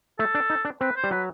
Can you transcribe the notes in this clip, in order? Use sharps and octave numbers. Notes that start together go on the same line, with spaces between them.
A3 A4
D4
D#4
D4
C4 B4
C5
G3
F#3 B4